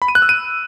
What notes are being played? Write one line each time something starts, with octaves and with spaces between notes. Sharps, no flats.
B5
D#7
F#6
E6
D#7